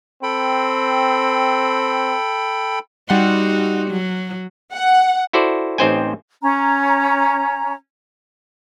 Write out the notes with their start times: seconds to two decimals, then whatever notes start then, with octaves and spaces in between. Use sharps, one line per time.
0.23 C4 A4 G5 B5
3.09 G3 D#4 F#4 F#5 C6
3.90 F#3
4.73 F#5
5.33 E4 F#4 A4 C5 D5
5.78 A1 C4 D#4 C5 G5 G#5
6.42 C#4 A#5